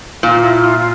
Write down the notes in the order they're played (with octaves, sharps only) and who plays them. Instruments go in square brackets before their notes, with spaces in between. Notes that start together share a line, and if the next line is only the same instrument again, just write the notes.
[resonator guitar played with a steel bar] A#2 [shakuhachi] F4
[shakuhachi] E4
F4
F4